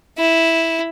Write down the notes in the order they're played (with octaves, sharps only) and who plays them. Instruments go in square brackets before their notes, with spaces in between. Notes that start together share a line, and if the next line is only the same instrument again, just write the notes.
[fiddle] E4